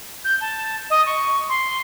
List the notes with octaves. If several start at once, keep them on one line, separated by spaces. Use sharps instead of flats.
G6
A5
D#5
C#6
C6